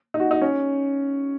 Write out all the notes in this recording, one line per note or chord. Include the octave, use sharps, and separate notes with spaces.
D#4
F#4
D#4
C#4